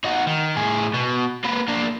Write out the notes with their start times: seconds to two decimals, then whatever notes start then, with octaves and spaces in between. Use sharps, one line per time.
0.04 D#4 F#4
0.27 D#3
0.56 A2 G#4
0.94 B2
1.45 A#3 B4
1.68 A#3 D4